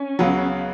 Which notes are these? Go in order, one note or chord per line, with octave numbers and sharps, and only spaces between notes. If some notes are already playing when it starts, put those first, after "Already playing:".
Already playing: C#4
C#2 C#3 F#3 B3